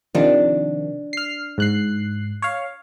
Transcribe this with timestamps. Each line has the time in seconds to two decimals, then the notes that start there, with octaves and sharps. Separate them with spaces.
0.15 C3 D#3 F3 D4
1.13 F6 C7
1.58 G#2 F#6 C7
2.42 C#5 F5